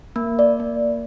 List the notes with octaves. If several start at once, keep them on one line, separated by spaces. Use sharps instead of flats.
A#3
D5
A#3